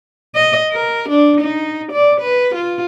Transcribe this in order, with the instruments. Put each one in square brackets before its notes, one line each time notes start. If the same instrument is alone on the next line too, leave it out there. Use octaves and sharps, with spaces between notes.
[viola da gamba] D#5
A#4
D4
D#4
D5
B4
F4